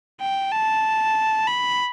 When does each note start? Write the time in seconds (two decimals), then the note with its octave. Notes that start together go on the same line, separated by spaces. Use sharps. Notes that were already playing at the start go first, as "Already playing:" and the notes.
0.21 G5
0.52 A5
1.47 B5